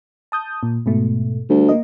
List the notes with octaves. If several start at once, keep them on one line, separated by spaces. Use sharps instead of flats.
A5 D#6 G6
A#2
G#2 B2 A3
D2 G3
A#3 D#5